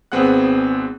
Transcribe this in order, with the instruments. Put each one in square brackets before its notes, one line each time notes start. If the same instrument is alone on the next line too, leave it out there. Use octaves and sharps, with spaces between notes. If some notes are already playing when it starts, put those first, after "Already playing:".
[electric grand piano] G#1 B3 C4 G#4 F#5 F#6